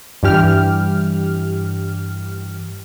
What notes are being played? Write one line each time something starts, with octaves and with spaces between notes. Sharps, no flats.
G2 E3 G4 F6